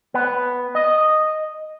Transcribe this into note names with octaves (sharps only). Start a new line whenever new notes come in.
B3
D#5